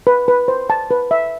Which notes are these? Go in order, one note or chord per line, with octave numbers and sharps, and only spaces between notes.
B4
B4
C5
A5
B4
E5